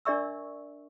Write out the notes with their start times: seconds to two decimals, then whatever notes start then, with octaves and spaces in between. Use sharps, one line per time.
0.05 D4 A#4 D5 E5 C#6 E6